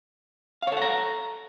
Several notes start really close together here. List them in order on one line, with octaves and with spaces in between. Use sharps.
F5 C#5 A4 F#5 A#5